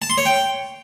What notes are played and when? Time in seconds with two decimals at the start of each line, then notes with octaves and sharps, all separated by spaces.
0.02 A5
0.10 C6
0.18 C#5
0.26 G5